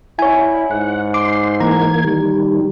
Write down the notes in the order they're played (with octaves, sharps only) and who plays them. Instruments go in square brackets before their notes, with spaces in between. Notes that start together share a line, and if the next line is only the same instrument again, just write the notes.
[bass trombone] E4 [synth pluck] C#5 G#5
[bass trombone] G#2 [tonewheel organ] F#5
[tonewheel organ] C6 [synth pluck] D6
[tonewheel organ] E3 A#3 G#6 [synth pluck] A#5
[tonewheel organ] D#3 G3